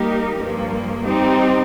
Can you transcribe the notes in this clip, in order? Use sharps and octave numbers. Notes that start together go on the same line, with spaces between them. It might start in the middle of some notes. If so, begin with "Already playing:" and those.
Already playing: G3 A#3 D#4 G4 A#4
G2 F3 A#3
G3 C4 D#4 G4